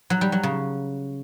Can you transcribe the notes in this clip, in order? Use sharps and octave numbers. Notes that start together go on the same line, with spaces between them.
F#3
G3
F#3
C#3